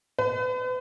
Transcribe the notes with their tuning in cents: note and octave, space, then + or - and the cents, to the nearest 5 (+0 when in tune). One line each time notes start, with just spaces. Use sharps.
B4 +40